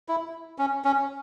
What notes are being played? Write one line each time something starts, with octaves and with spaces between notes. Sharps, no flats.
E4
C#4
C#4